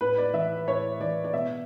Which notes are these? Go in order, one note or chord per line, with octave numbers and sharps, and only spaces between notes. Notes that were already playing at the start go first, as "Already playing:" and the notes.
A2 B4
D5
E3 E5
A2 C#5
E3 D5
D5
B2 E5